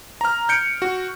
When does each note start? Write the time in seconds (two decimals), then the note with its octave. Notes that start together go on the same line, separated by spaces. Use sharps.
0.21 A#5 F6
0.49 G6 C#7 D7
0.82 F#4